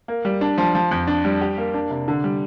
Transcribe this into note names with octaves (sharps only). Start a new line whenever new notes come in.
A#3
G3
D4
F3
F3
F2
D4
G3
G4
A#3
D4
C3
D3
G3